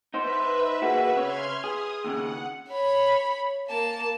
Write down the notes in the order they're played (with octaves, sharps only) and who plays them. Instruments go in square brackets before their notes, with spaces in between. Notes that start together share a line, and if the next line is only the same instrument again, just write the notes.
[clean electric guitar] D#4 C5 [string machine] B4 E5
[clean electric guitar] A#3 F#4 G#4
[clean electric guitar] C#3 C#5 [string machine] C6 F6 G#6
[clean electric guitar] G#4 [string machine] D#6
[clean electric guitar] D#2 C#3 [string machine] F#5
[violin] C#5 B5
A#3 A5